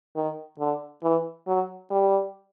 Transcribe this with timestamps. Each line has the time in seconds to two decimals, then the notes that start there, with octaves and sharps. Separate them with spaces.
0.16 D#3
0.59 D3
1.03 E3
1.47 F#3
1.91 G3